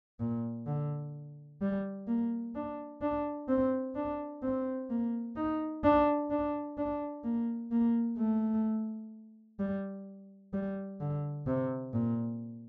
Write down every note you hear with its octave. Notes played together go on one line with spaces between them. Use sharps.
A#2
D3
G3
A#3
D4
D4
C4
D4
C4
A#3
D#4
D4
D4
D4
A#3
A#3
A3
G3
G3
D3
C3
A#2